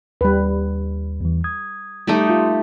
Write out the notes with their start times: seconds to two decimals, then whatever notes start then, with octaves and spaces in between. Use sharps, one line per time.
0.21 D#2 G3 B4
1.20 E2 E3
1.44 D#6 G#6
2.07 G3 A3 D#4 G4
2.30 F4